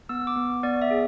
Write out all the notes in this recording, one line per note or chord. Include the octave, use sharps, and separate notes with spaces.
B3 E6
D6
B3
B3 D5
E5
G#4